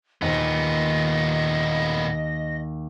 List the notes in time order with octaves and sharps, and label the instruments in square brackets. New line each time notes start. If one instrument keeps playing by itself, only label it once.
[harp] D#2 [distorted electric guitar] A#2 B3 [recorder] D#5